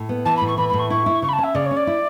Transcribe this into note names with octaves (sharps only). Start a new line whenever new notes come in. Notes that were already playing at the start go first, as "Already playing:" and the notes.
Already playing: A2
B3
E3 A5
B5
A2
C#6
E3 B5
A2 B5
C#6
E4 C#6
E4
C#3 C#6
B5
A5
C#4 E5
C#3 D5
C#5
C#4
D5
E4